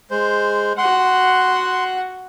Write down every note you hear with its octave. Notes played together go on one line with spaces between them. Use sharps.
G#3 C5
F#4 F#5 C6